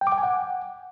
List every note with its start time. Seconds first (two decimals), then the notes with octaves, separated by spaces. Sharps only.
0.01 G5
0.07 D6
0.12 G5
0.18 G#5
0.23 F#5